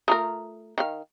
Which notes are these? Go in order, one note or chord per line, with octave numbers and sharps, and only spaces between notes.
A3 F4 A#4 A#5 D#6
D#3 F5